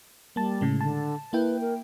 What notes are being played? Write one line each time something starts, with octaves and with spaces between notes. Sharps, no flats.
G3 A#3 A5
A2 C#3 G#3
D3 A5
A#3 E4 B4 G5
A#4